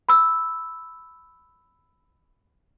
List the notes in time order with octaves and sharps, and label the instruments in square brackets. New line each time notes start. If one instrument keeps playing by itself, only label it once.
[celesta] B5 E6